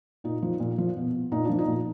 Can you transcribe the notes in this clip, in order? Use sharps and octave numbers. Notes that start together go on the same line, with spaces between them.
A#2 D#4
F3
A#2
F3
B2
A#2 D#4
F3 D4
D#4
A#2